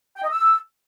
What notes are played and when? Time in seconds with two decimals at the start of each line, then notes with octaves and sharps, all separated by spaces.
0.17 G5
0.24 D#5
0.31 E6